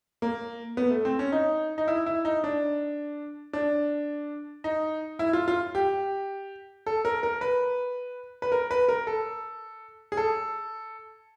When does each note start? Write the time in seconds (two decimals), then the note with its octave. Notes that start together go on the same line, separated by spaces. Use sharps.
0.22 A#3
0.77 B3
0.91 A3
1.05 C4
1.19 C#4
1.32 D#4
1.78 D#4
1.88 E4
2.06 E4
2.25 D#4
2.44 D4
3.53 D4
4.64 D#4
5.19 E4
5.33 F4
5.48 F4
5.75 G4
6.86 A4
7.05 A#4
7.23 A#4
7.41 B4
8.42 B4
8.52 A#4
8.71 B4
8.89 A#4
9.07 A4
10.12 G#4
10.17 A4